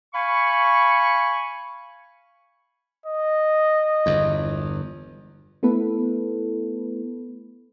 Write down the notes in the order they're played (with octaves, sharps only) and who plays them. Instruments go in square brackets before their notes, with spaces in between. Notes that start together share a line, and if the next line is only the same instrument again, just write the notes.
[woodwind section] F5 G#5 B5 C#6
[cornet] D#5
[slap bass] G1 E2
[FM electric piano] A3 B3 E4 A4 B4